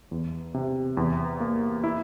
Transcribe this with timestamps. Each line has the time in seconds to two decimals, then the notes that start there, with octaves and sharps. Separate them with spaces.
0.11 E2
0.54 C3
0.97 E2
1.40 A#3
1.84 E4